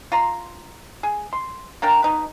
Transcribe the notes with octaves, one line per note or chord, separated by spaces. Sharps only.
F4 A#5 C6
G#4
C6
A#3 D4 A#4 G5
B2 D#4 B4